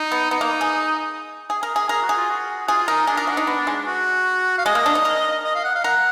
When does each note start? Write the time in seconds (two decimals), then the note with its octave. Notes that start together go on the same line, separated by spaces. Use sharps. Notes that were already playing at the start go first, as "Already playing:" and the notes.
Already playing: D#4
0.12 B3
0.31 B3 D#4
0.41 A#3
0.61 G#4
1.50 G#4
1.63 A#4
1.76 G#4
1.89 G#4 A#4
2.03 F#4
2.09 G#4
2.17 F4
2.30 F#4
2.68 F4 G#4
2.88 D#4 A#4
3.07 D4 G#4
3.17 A#4
3.27 F#4
3.37 D#4
3.47 B3
3.67 G#3
3.86 F#4
4.58 F5
4.65 G#3 D#5
4.75 A#3
4.86 D4
4.95 D#4
5.05 A#4
5.44 D#5
5.55 F5
5.64 F#5
5.75 F5
5.84 A#4 F#5